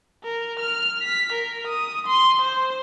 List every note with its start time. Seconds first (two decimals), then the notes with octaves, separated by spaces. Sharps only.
0.24 A#4
0.59 F6
1.02 B6
1.33 A#4
1.67 D#6
2.07 C6
2.42 C5